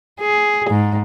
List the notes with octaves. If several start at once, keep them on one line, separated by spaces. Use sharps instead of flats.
G#4
G#2